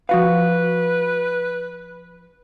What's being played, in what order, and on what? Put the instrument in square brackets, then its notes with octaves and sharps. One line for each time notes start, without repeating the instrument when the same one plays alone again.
[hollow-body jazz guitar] F3 F#4 F5 [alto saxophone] B4